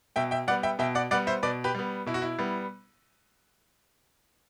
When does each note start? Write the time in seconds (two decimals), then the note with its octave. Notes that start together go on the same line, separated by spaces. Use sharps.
0.16 B2 E5 G5
0.31 E5 G5
0.48 G3 B3 D5 F#5
0.63 E5 G5
0.79 B2 E5 G5
0.95 D5 F#5
1.11 G3 B3 D5 F#5
1.27 C5 E5
1.43 B2 B4 D5
1.64 G4 B4
1.75 G3 B3
2.06 B2 E4
2.14 F#4
2.22 E4
2.39 G3 B3